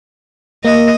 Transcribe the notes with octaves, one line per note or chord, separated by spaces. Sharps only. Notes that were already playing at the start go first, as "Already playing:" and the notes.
A#3 D#5